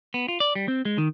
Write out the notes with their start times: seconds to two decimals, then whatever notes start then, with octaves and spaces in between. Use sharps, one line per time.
0.14 B3
0.28 F4
0.40 D5
0.55 G3
0.68 C4
0.85 G#3
0.98 D#3